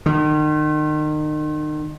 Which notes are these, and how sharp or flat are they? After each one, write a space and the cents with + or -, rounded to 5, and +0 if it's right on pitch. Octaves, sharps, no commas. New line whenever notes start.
D#3 -35